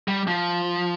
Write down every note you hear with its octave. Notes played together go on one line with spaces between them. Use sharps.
G3
F3